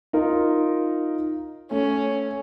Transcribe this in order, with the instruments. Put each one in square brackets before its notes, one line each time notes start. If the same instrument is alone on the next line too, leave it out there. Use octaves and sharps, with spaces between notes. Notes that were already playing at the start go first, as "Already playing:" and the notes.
[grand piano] D#4 F4 A#4
[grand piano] A3 [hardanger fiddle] C#4